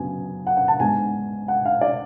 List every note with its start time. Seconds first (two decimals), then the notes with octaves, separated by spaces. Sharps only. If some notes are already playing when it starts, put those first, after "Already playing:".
Already playing: F#2 C#3 F#3 B3 D4 G#5
0.47 F#5
0.57 F#5
0.68 A5
0.79 G#2 G#3 B3 D4 G#5
1.48 F#5
1.65 F5
1.81 D5